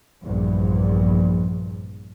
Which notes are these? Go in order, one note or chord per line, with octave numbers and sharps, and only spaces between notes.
A#1 E2 G2